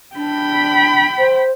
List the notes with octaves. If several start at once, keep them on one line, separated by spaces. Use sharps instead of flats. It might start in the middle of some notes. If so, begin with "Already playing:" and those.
D4 G5 B5
C5